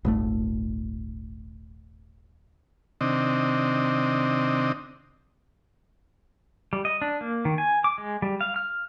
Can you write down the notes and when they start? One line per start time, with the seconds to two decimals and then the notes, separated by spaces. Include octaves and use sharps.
0.05 D#1 G#1 A3
3.01 C3 D#3 C4 D4 D#5
6.73 G3
6.85 D#5
7.02 D4
7.21 A#3
7.45 D#3
7.58 G#5
7.84 D6
7.98 G#3
8.22 G3
8.41 F5
8.56 F6